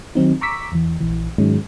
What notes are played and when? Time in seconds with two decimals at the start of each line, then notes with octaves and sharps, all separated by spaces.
0.15 D#3 F#3 C4 D#4
0.41 A#5 C#6 D6 E6 B6
0.72 E2 E3
1.00 A#1 E3
1.38 G#2 D#3 F#3 G#3 C#4